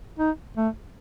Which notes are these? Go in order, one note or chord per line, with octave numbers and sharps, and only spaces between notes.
D#4
A3